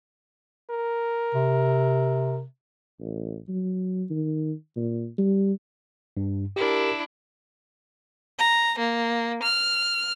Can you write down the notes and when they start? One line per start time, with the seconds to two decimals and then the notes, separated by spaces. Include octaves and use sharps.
0.71 A#4
1.35 C3
3.00 A1
3.49 F#3
4.10 D#3
4.76 A#2
5.18 G3
6.17 G2
6.56 D4 E4 G4 A#4
8.38 A#5
8.79 A#3
9.43 F6